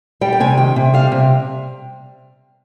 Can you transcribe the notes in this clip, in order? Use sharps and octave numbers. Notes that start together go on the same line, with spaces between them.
G3 G5
G5
C3 G#5
D#3 G5
C3
G3 F5
C3